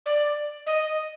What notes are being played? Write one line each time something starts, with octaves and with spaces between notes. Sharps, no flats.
D5
D#5